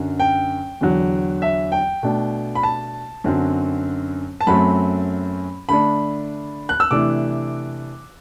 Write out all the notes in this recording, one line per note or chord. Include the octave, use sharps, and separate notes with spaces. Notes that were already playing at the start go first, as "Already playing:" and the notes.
Already playing: F#2 D3 F#3
G5
E2 D3 F#3
E5
G5
B2 A3 D4
B5
A5
F#2 D3 F#3 C4
A5
F#2 F#3 A3 C4 B5
D3 A3 D4 B5
F#6
E6
C3 E3 A3 D4 D6